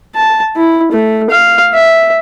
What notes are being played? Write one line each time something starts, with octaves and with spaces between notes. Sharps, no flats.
A5
E4
A3
F5
E5